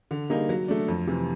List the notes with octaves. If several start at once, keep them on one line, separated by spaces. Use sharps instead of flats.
D3
G3 A#3 D#4 G#4
F#3
A3 D4
F2
C3 E3